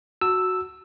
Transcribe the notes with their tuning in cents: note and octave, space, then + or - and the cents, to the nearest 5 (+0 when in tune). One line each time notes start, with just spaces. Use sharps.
F#4 +0 A5 +35 E6 +0